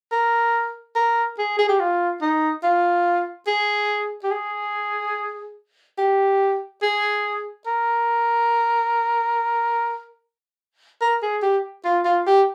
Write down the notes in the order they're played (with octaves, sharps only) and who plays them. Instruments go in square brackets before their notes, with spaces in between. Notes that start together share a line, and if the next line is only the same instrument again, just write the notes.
[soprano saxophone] A#4
A#4
G#4
G#4
G4
F4
D#4
F4
G#4
G4
G#4
G4
G#4
A#4
A#4
G#4
G4
F4
F4
G4